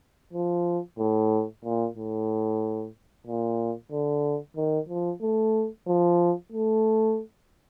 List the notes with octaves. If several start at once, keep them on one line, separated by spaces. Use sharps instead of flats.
F3
A2
A#2
A2
A#2
D3
D#3
F3
A3
F3
A3